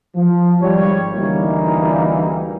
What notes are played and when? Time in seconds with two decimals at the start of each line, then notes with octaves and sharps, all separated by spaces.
0.16 F3
0.61 G#1 G3 C#5
1.15 D2 D3 E3 G3 A#3 D#4